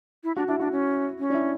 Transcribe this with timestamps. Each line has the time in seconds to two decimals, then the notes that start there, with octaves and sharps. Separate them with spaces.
0.24 E4
0.36 D4 F#4
0.47 D4 E4
0.59 D4 F#4
0.72 C#4
1.19 C#4
1.30 D4
1.34 E4